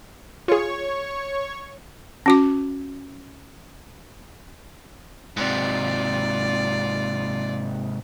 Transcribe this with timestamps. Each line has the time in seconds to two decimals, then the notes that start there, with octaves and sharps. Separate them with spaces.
0.48 F4 G#4 C#5 C#6
2.26 C#4 F#4 D6
5.37 G#2 C3 F4 D5